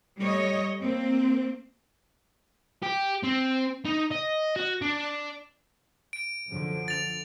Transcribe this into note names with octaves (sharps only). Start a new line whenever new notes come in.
G3 A3 C#5 D#5
A#3 C4
G4
C4
D#4
D#5
F#4
D4
D7
F#2 D3 F3
A6 F7